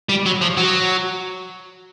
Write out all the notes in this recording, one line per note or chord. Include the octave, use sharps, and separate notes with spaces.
G3
F#3
F3
F#3